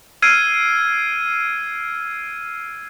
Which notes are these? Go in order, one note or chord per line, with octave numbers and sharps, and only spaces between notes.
E6 F6 G#6 C7 D7 D#7